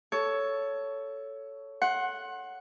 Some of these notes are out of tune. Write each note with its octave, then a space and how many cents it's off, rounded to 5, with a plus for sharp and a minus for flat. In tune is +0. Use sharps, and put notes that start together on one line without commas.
A4 +0 C#5 +10
F#5 +0 C6 +35